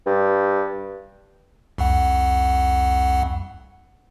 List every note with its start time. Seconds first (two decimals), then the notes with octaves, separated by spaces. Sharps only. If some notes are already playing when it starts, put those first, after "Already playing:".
0.06 G2
1.78 C2 F2 F#5